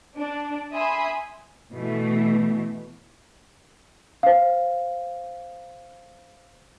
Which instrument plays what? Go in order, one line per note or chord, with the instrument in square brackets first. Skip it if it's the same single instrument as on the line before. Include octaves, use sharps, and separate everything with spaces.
[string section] D4
E5 G#5 B5 C6 D#6
B2 E3 A3
[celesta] C5 F5